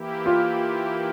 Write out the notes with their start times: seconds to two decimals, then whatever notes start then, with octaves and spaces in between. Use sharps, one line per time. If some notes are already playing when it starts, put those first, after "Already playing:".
Already playing: E3 A#3 E4 G4
0.26 F4